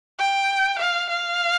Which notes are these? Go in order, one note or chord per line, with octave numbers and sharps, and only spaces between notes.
G5
F5
F5